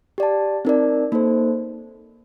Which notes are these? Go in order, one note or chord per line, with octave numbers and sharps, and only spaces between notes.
G4 D5 A5
C4 D#4 A#4 D5
A#3 D#4 A4 C5